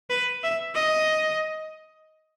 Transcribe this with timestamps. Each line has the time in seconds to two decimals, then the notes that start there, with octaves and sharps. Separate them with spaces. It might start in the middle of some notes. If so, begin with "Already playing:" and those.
0.10 B4
0.43 E5
0.75 D#5